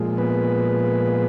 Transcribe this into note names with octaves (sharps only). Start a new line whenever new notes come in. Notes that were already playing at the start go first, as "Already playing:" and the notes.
Already playing: A#2 F3 G#3
B3 B4